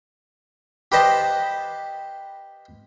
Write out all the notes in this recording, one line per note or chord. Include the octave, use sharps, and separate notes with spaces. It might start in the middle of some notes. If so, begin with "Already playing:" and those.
G4 B4 C5 D#5 A5